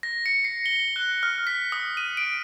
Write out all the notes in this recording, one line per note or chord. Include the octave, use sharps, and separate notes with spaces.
A#6
C#7
C7
G7
F#6
F6
B6
D#6
D#7
D7